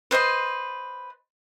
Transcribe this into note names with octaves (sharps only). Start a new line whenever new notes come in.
B4 C5 D#5 C6